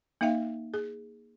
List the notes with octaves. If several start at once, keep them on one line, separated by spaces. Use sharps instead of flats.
A#3 D#4 E5 F5 G5
G#4